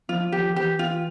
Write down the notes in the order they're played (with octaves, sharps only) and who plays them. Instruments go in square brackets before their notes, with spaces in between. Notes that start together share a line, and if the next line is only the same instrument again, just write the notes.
[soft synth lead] F3 [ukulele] F4
[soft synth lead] F3 [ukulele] G4
[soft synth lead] F3
[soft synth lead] E3 [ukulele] G4
[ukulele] F4